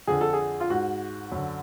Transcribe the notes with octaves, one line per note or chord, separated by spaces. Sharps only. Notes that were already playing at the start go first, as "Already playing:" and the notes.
F2 D3 G#4
A4
G#4
F4
G#2 F#4
F#2 D3